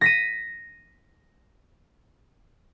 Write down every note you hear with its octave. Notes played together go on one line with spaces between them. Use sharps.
A#6 B6 D#7